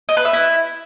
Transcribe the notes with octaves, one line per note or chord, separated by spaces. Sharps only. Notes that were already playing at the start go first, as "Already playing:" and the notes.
D#5
B4
E5
E4